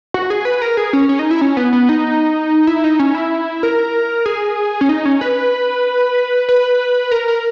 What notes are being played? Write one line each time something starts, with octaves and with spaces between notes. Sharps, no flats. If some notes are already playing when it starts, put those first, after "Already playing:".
F#4
G#4
B4
A#4
G#4
C#4
C#4
D#4
E4
C#4
B3
B3
D#4
E4
D#4
C#4
E4
A#4
G#4
C#4
D#4
C#4
B4
B4
A#4
A#4